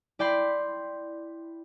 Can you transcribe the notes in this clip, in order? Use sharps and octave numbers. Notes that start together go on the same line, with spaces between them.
E4 D5 G5 B5 C6